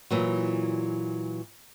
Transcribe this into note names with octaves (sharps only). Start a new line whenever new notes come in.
A#2 E3 F#3